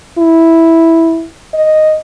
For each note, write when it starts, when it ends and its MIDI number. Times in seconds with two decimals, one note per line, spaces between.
0.18 1.26 64
1.54 1.97 75